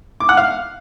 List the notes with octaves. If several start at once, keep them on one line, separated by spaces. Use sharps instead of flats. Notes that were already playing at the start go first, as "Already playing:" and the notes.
D6
F#5
F5